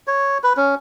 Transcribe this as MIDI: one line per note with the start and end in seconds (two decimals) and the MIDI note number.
0.07 0.38 73
0.43 0.53 71
0.57 0.75 61